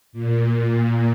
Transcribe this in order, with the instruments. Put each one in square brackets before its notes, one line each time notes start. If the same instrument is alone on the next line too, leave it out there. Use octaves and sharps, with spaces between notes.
[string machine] A#2